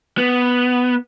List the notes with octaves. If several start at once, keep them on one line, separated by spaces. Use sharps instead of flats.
B3